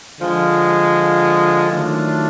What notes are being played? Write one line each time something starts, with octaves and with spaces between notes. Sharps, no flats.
D3 F3 G#3
D#3 F#3 A3 D4 F4